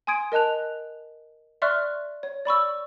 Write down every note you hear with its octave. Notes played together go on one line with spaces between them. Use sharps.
G#5 C6 D#6 G#6 D7
A#4 D#5 A5 F#6 F7
D5 E5 C6 C#6 F6 F#6
C#5
D5 B5 C#6 E6